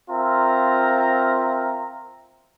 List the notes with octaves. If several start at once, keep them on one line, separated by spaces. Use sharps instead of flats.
C4 F4 A#4 E5 A#5